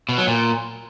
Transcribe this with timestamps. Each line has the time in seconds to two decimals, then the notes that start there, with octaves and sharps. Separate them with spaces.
0.09 B2
0.18 F#3
0.27 A#2